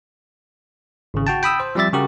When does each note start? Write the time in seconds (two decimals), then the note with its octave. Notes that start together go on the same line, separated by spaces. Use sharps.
1.14 G#1 C#3
1.27 F#4 G5 A5
1.43 G5 B5 D#6 E6
1.60 C5
1.75 F3 G3 C4 D5 E5 A6
1.93 C#3 F#4 G4 A#4